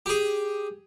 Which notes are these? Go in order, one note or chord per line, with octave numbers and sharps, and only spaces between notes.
G4 G#4